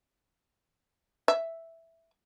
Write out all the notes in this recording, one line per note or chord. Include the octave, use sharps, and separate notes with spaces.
E5